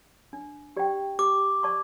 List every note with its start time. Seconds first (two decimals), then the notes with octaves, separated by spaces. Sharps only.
0.33 D4
0.77 G4 D5 G5
1.19 G4 D6
1.63 D5 A5 C#6